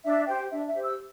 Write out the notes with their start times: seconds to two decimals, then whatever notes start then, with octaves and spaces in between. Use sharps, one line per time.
0.05 D4 E5
0.27 G4 C5 G5
0.51 D4 E5
0.68 E5
0.75 G4 C5
0.84 E6